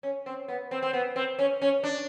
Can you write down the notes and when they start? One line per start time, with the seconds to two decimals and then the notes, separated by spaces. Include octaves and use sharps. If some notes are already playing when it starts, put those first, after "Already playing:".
0.03 C#4
0.26 C4
0.48 B3
0.71 C4
0.82 C4
0.93 B3
1.16 C4
1.39 C#4
1.62 C#4
1.84 D4